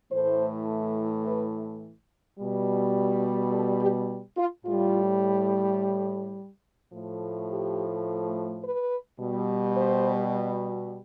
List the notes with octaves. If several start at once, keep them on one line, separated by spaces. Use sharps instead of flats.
A2 E3 A3 C5
B4
B2 G3
A4
G4
F4
A2 G3 F4
A2 F3 A3
G4
B4
B2 G3
C5